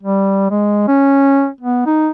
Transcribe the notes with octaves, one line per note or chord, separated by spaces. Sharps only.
G3
G#3
C#4
B3
D#4